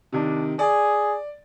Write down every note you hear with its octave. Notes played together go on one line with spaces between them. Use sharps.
C3 D#3 D4
G#4 D5